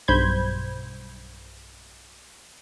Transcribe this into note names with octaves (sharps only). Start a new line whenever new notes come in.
B1 G2 C5 B5 G6 G#6